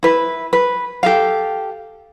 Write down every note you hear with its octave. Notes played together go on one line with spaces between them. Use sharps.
E4 B4
B4
G4 A4 F5